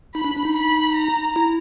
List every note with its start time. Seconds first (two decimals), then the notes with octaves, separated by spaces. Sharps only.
0.15 D#4 B5
0.25 D4
0.36 D4
0.45 D#4
0.55 B5
0.95 A#5
1.36 E4